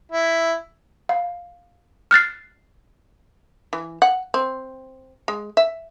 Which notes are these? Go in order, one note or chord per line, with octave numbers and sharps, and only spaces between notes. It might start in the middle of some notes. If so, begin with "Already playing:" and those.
E4
F5
F6 F#6 A6 C7
E3
F#5
C4
G#3
E5